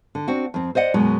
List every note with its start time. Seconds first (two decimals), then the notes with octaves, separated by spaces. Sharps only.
0.15 D3
0.28 C4 D4 F#4
0.54 F2 C4
0.75 C5 D5 D#5 F#5
0.94 F#2 B2 G#3